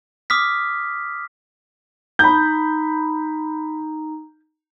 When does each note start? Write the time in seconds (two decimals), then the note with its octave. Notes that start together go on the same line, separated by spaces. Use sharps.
0.30 D6 D#6 F6 B6
2.19 D#4 A#5 B5 G6